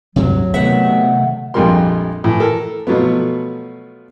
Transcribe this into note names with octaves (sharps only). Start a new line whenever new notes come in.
D2 G2 C3 F#3
C3 D#3 A3 B3 E5 F#5
A#1 F2 G3 G#3 A#4 C6
A2 E3
A4 A#4
B2 F3 F#3 A3 B3